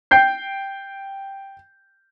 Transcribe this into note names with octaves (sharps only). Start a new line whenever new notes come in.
G5 G6 C7